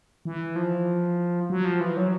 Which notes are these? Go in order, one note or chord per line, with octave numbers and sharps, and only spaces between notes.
E3
F3
F#3
F3
E3
F#3